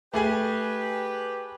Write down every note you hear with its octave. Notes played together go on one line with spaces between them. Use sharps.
A3 G4 G#4 B4 G#5